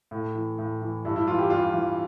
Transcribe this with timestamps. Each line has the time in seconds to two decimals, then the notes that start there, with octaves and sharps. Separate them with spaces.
0.11 A2
0.35 E3
0.59 A2
0.81 E3
1.05 G2 E4
1.16 E4
1.27 E3 F4
1.39 G4
1.50 G2 F4
1.73 E3